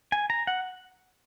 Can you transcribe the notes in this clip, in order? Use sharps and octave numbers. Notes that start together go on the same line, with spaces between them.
G#5
A#5
F#5